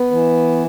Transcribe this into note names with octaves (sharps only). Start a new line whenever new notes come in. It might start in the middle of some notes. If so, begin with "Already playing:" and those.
Already playing: B3
E3